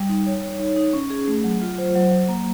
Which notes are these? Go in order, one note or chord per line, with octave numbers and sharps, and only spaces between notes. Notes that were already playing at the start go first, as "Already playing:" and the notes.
Already playing: G3
D#4
C#5
C#5
D#4
D#4
C#4
G#4
A3
F#3
F4
C5
F#3
F#3
A#3